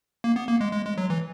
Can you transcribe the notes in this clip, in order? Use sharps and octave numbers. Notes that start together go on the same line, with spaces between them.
A#3
B3
A#3
G#3
G#3
G#3
F#3
E3